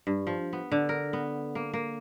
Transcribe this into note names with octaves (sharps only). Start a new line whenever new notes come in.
G2
F3
B3
D3
A#4
B3
A#3
A#3